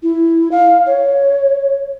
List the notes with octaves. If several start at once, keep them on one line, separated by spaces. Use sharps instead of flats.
E4
F5
C#5